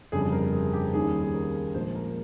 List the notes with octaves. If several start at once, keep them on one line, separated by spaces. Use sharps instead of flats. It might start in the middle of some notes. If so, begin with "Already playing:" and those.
G1 F2 C#3 G3 C4 G#4
A#4
G#4
G4
D#2 D#3 G3 C#4 G#4
G#4
A#4
A#1 A#2 F3 G#3 C5
A#4